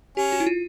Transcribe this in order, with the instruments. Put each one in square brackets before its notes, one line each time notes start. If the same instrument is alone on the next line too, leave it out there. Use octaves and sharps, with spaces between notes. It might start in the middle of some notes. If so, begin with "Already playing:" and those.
[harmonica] C#4 [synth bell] G4
[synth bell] F#4
E4
F4